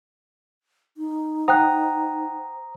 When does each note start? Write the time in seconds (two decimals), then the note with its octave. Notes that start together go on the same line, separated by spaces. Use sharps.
0.97 D#4
1.48 C5 F#5 G5 A#5 D#6 F#6